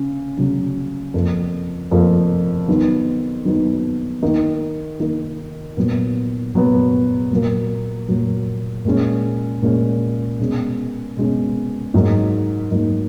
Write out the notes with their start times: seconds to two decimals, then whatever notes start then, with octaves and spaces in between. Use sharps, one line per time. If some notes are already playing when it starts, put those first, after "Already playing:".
Already playing: C#3 C#4
0.37 C#3 F#3 C#4
1.14 F2 F3 A#3
1.91 F2 F3 A#3
2.68 D#3 F#3 B3 D#4
3.45 D#3 F#3 B3 D#4
4.22 D#3 A#3 D#4
5.00 D#3 A#3 D#4
5.77 A#2 F#3 B3
6.54 A#2 F#3 B3
7.31 A#2 F#3 A#3
8.08 A#2 F#3 A#3
8.85 A#2 G#3 C#4
9.62 A#2 G#3 C#4
10.40 B2 G#3 C#4
11.17 B2 G#3 C#4
11.94 G#2 F#3 A#3 D#4
12.71 G#2 F#3 A#3 D#4